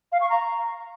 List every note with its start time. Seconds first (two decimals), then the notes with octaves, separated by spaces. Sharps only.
0.12 F5
0.21 C#6
0.30 A#5